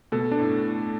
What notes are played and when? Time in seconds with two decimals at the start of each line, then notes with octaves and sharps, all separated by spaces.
0.12 B2 A4
0.32 D4
0.39 A2